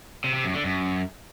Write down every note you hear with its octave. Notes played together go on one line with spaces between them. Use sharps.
C3
C3
F#2
D3
F#2